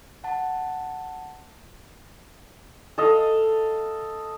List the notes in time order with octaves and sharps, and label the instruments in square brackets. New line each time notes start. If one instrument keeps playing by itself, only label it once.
[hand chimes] F#5 A5
[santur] A4 D#5 F5